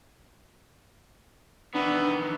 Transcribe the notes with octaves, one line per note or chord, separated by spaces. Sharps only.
D#3 E3 B3 D4